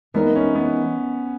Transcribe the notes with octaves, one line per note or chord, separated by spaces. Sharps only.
E3 G#3 B3 D#4 A#4 C#5
C#4
B3